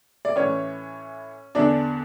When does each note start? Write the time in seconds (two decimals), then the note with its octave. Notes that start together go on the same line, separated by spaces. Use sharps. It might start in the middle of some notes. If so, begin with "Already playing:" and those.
0.25 D5
0.36 A2 E3 C#4 C#5
1.55 E2 D3 D4 D5